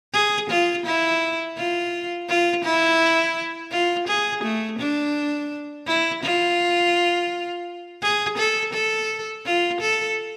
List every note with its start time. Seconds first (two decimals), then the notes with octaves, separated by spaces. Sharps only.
0.13 G#4
0.50 F4
0.85 E4
1.57 F4
2.28 F4
2.64 E4
3.71 F4
4.08 G#4
4.43 A3
4.79 D4
5.86 E4
6.23 F4
8.02 G#4
8.37 A4
8.73 A4
9.46 F4
9.81 A4